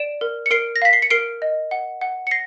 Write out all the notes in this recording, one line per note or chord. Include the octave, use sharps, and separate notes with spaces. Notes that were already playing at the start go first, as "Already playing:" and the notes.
Already playing: D5 D7 E7
A#4
C#7
A#4 C7 D7
A#6
F5 B6
C7
C#7
A#4 C7 D7
D#5
F#5
F#5
C#7
A#6 C7